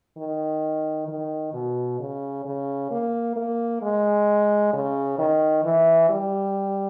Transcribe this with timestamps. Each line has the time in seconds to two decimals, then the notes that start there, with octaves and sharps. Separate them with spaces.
0.17 D#3
1.08 D#3
1.54 B2
2.00 C#3
2.45 C#3
2.91 A#3
3.36 A#3
3.82 G#3
4.73 C#3
5.19 D#3
5.65 E3
6.10 G3